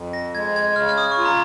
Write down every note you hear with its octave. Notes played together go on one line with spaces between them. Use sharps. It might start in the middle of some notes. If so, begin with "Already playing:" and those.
Already playing: F2
A#6
G#3 G#6
G#6
C#3 F6
F6
D#6
C#6
F4
A#5